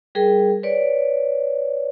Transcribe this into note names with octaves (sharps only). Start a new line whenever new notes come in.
G3 G#4 A#4 G5
B4 C#5 D5